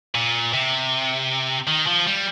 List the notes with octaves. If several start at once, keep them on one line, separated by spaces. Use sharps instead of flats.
A#2
C3
D#3
F3
G3